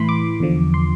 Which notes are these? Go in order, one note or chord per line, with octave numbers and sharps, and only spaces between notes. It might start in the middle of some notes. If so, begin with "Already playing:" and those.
Already playing: A2 E3 B5 C6
D6
E2 D3 F3
C6